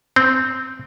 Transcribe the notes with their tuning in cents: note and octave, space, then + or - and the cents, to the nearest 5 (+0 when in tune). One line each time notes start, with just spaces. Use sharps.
C4 -10